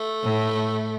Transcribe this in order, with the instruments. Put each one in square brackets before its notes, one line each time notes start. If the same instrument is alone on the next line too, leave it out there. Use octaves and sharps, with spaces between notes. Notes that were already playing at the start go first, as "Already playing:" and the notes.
Already playing: [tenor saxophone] A3
[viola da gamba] A2